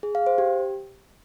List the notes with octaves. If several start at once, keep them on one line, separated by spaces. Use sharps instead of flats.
G#4
F5
C5
G4